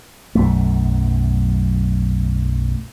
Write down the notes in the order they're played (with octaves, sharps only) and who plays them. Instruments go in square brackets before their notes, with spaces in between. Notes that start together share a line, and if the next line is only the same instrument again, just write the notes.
[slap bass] B1 F#2 A3